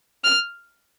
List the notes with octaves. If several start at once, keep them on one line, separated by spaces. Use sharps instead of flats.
F6